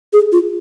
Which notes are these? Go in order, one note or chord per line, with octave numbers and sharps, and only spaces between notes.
G#4
F4